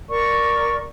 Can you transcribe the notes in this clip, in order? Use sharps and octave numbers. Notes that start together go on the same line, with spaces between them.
A#4 D5 C#6